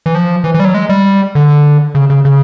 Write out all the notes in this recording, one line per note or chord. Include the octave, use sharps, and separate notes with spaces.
E3
F3
E3
E3
G3
F#3
G#3
G3
D3
C#3
C#3
C#3